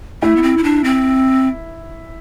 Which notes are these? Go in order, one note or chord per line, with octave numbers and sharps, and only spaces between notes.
A3 E4
B3
C4
E4
D4
C4